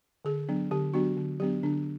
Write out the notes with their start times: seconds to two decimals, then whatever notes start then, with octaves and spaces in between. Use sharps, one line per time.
0.25 D3 G#4
0.49 F#3 B3 D4
0.71 D3 G4
0.94 F#3 B3 D4 F#4
1.17 D3
1.40 F#3 B3 D4 G4
1.63 D3 D4